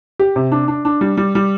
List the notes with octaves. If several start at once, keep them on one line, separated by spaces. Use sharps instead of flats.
G4
C3
D4
D4
D4
G3
G3
G3